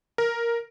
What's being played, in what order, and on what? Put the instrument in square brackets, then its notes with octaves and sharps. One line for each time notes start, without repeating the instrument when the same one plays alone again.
[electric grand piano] A#4